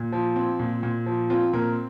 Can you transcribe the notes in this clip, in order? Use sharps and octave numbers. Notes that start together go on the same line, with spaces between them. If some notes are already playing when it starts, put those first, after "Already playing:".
Already playing: A#2
F3
C4
A#2
A#2
F3
C4 F4
A#2 A#4